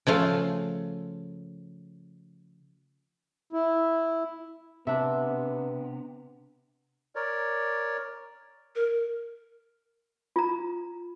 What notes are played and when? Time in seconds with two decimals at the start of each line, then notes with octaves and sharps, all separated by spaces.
0.07 C#3 F3 A3 F5
3.53 E4
4.87 C3 B3 D4 E5
7.15 A#4 C#5 D5
8.76 A#4
10.36 F4 A#5